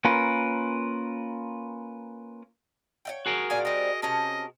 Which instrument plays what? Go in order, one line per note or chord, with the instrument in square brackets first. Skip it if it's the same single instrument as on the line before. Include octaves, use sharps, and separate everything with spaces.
[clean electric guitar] A#3 C#4 F4 A#4 B4
[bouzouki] C#5 E5 G5
[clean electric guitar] F#4 G#4 A#4
[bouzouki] A#2 D5 F5 [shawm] G#5
[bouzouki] G3 C4 [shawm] D#5
[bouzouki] C3 C#4 A5 [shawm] D#5